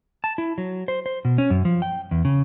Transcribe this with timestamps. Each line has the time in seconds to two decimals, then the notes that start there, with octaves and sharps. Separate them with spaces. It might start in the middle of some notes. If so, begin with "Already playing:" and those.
0.24 A5
0.38 E4
0.58 F#3
0.88 C5
1.06 C5
1.25 B2
1.38 C#4
1.50 F#2
1.65 F3
1.82 G5
2.11 E2
2.25 C#3